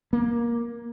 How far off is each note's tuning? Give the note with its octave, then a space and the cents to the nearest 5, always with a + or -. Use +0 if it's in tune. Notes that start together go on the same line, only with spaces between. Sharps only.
A#3 +15